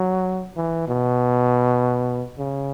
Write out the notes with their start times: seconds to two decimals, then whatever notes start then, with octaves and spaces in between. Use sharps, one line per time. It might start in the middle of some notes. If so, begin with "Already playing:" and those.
Already playing: F#3
0.57 E3
0.88 B2
2.38 C#3